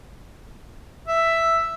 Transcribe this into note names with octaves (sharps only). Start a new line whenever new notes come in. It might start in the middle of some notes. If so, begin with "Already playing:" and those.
E5